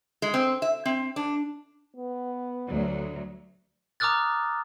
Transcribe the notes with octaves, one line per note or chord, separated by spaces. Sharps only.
G#3
C4
E5
C4
D4
B3
D2 F#3
A#5 D6 D#6 F6 F#6 A6